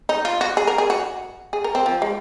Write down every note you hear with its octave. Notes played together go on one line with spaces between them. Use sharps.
D#4
F4
F#4
G#4
A#4
G#4
F#4
G#4
A#4
C4
F3
G#3